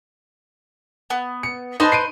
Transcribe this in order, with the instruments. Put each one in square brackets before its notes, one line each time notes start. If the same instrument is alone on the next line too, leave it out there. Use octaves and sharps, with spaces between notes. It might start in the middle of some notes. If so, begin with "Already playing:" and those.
[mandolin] B3
[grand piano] C#7
[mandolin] D#4 B4 C5 [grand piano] D#5 A5
[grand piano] C7 D7 D#7